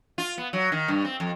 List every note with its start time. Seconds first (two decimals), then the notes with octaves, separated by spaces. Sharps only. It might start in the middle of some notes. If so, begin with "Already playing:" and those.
0.18 F4
0.38 B3
0.53 F#3
0.72 D#3
0.88 G2
1.05 C4
1.20 F2